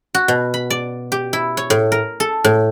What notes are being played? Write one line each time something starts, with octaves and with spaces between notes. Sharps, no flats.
F#4
B2
B5
D5
G4
E4
C#5
A2
A#4
A4
A2